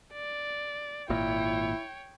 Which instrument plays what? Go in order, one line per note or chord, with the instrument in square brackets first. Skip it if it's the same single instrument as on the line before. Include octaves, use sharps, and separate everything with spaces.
[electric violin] D5
[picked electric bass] G#1 A#2 [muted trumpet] E4 [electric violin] C#5 G5